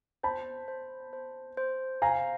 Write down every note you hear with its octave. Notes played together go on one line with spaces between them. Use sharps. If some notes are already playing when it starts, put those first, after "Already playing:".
C5 A5 B5
C5
C5
C5
F5 G#5 A#5